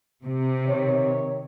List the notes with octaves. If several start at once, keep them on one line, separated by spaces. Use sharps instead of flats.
C3
D#3 C#5